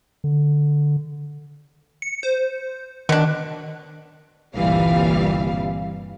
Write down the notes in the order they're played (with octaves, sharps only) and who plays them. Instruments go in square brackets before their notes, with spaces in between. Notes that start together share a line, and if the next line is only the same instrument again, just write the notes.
[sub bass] D3
[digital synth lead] C#7
C5
[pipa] B2 D4 [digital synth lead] D#3
[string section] G1 C2 A#2 E3 G3 F5